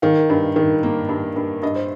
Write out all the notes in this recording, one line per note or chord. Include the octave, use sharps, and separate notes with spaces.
D#3 F5
G2
D#3
A#3
G2
G2
G2 D#5
C5